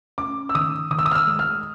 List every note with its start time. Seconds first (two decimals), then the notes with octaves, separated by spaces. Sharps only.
0.18 C#4 D6
0.49 E6
0.54 D#3 D#6
0.90 D#3 D#6
0.99 E6
1.06 D#6
1.11 F6
1.15 E6
1.27 G#3
1.39 F6